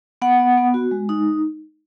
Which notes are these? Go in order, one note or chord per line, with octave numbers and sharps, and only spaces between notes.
B3 F#5
B3
B3
F#4
G#3
D#4